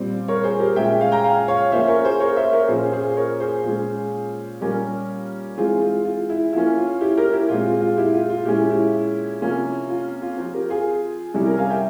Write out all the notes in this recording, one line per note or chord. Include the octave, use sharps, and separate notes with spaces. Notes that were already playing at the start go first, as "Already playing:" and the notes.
Already playing: A#2 G3 C4
A#4 C#5
G#4 C5
G4 A#4
A#2 G#3 C#4 E5 G5
F5 G#5
G5 A#5
F5 G#5
C#5 F5
F3 A#3 C#4 C5 E5
A#4 C#5
G#4 C5
A#4 C#5
C5 E5
A#4 C#5
A#2 F3 A#3 C#4 G#4 C5
G#4 C5
A#4 C#5
G#4 C5
A#2 G#3 C#4
A#2 G3 A#3 C#4 G4 A#4
E3 G#3 C4 F4 G#4
F4
F4
E4
F3 A#3 C#4 E4
F4
E4 G4
G4 A#4
E4 G4
A#2 G#3 C4 F4
F4
F4
E4 G4
F4
F4
A#2 G#3 C#4 E4 G4
E4 G4
C3 F3 A#3 C#4
F4
F4
F3 C4 F4
G4 A#4
F4 G#4
C3 G3 C#4 E4 G4
G4 A#4
F5 G#5
E5 G5